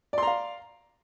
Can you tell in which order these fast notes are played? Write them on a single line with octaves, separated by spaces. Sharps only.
D5 C6 A#5 F5